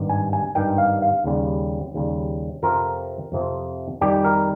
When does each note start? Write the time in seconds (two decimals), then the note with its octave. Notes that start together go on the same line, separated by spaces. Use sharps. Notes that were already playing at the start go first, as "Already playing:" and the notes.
Already playing: G#1 G2 D#3
0.09 G#5
0.33 G#5
0.55 G#1 G2 D#3 G5
0.78 F5
1.02 F5
1.24 D#2 C#3 G3
1.94 D#2 C#3 G3
2.63 F2 C3 F3 C4 A#4
3.32 F2 C3 F3 C4
4.01 F2 D#3 G3 G4
4.24 A#4